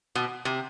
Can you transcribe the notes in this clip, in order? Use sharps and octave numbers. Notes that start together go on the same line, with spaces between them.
B2
C3